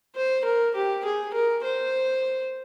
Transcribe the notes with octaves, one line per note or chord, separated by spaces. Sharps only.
C5
A#4
G4
G#4
A#4
C5